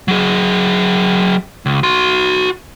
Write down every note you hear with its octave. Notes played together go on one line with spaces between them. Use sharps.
F#3 G#4
C#2
F#4 C6